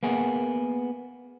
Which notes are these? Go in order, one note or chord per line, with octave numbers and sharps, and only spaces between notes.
A#3 B3 G#4